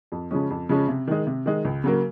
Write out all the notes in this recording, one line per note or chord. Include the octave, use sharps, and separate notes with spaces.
F2
C#3 F3 G#3 C#4
F2
C#3 F3 G#3 C#4
C3
D#3 G#3
C3
D#3 G#3
C#2
C#3 F#3 A#3